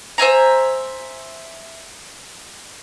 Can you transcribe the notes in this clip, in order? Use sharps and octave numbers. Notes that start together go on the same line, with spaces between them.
C5 E5 G#5 A#5